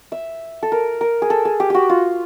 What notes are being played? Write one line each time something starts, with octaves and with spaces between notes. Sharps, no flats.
E5
A4
A#4
A#4
G#4
A4
G#4
G4
F#4 G4
F4